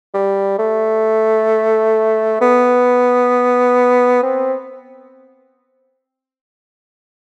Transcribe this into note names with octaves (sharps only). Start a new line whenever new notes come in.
G3
A3
B3
C4